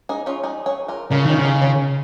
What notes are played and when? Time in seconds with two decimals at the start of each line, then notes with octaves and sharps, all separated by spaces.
0.09 D#4 G#4
0.26 C#4 F4
0.43 D#4 G#4
0.66 G#4 C#5
0.88 F4 A#4
1.11 C#3 F4 A#4
1.25 D#3 C#4 F4
1.38 C#3
1.45 D#4 G#4
1.62 C#4 F4